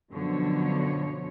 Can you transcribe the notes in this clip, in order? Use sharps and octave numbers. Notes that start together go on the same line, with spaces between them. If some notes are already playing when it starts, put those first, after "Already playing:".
F#2 B2 D3 F3 F#3 C#5